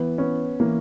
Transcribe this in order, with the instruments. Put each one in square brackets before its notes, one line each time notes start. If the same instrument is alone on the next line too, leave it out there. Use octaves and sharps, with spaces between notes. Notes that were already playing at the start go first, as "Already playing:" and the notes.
Already playing: [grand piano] E3 [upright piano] B3
[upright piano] B3 [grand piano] C#4
[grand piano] E3 [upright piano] A#3